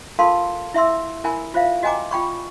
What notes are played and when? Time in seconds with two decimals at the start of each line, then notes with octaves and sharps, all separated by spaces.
0.19 F4 A4 A#4 F5 A5 C6
0.74 E4 E5 C6 E6
1.24 E4 A#4 G#5 B5
1.54 F4 C5 E5 F5
1.83 F#4 D#5 G5 G#5 A#5 D6
2.11 F4 G5 B5 C#6